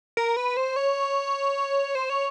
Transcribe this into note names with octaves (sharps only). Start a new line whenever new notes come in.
A#4
B4
C5
C#5
C5
C#5